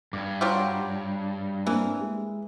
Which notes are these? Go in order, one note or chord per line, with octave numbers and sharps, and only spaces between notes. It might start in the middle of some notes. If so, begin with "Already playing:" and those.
G2 D6 G#6
F#3 F4 G4
E3 A#3 C4 D4
G#3